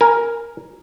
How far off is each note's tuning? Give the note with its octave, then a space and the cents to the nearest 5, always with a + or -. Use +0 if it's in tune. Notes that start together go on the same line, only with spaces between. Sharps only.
A#4 +0 G#5 +0